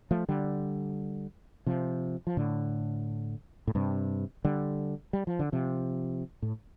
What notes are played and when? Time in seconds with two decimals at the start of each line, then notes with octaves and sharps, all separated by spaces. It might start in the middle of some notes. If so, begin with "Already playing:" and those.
0.11 F3 A3
0.29 D3 G3
1.66 C3 F3
2.27 F3
2.37 A2 D3
3.67 A2
3.75 G2 C3
4.45 D3 G3
5.13 G3
5.27 F3
5.39 D3
5.52 C3 F3
6.42 A2